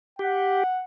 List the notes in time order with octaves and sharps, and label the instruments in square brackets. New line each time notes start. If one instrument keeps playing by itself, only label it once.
[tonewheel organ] G4 [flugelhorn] F#5